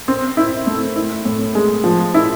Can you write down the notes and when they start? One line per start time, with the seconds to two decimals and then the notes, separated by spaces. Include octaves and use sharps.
0.08 C4
0.37 E4
0.67 A3
0.96 E4
1.25 A2
1.55 G#3
1.84 F3
2.14 E4